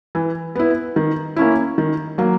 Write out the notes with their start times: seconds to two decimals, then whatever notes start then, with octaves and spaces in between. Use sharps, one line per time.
0.15 E3
0.55 B3 E4
0.96 D#3
1.36 A#3 C#4 E4
1.78 D#3
2.18 F#3 A#3